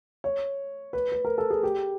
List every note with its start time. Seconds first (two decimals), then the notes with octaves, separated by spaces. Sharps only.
0.24 C#5
0.93 B4
1.12 B4
1.25 A#4
1.38 A4
1.50 G#4
1.63 G4